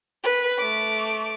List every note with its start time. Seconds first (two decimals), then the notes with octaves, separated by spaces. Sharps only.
0.23 B4
0.59 A3 D6